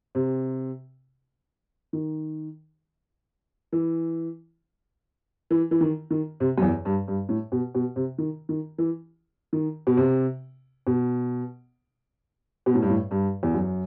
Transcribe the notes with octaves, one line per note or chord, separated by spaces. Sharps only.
C3
D#3
E3
E3
E3
D#3
D#3
C3
F#2
E2
G2
G2
A2
B2
B2
C3
D#3
D#3
E3
D#3
B2
C3
B2
B2
A2
G2
A2
G2
E2
F#2